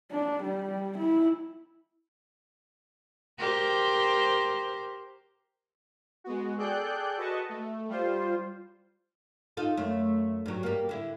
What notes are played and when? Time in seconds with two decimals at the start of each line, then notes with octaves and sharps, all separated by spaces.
0.11 D4
0.43 G3
0.98 E4
3.39 G4 A#4 C5
6.24 G#3 B3 F#4
6.58 G#4 A4 D5 G5 F#6 G6
7.17 F#4 B4 D#5 A5 C#6
7.49 A3
7.89 G3 F4 C5
9.57 D#4 F4 A4
9.77 F#2 A3
10.46 G2 F#3
10.63 G3 A#3
10.89 D3 E4